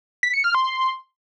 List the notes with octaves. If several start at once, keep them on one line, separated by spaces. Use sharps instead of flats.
B6
C#7
F6
C6